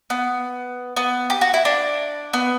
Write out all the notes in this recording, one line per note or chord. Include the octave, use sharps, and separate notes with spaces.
B3
B3
G4
F#4
E4
D4
B3